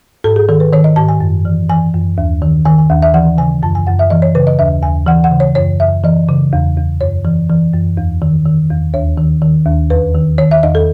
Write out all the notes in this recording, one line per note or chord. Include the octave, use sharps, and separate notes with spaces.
G#2 A4
G#4
D#3 A4
B4
D#3 C#5
D#5
G#2 A5
G#5
F#2
E3
E3 G#5
F#2
D#2
D#3
D#3 G#5
G#5
D#2 F#5
E5
E3 F#5
C#3 G#5
F#2 A5
G#5
F#2 F#5
E5
E3 D#5
C#5
C#3 B4
D#5
D#2 E5
D#2 G#5
E3 F#5
F#5
C#3
C#5
F#2 C#5
F#2 E5
E3 D#5
C#3
E2
E2
F#2 C#5
E3
E3
F#2
E2
D#3
D#3
E2
D#2 C#5
D#3
D#3
D#2
E2 B4
D#3
D#3 C#5
E5
E2 D#5
A4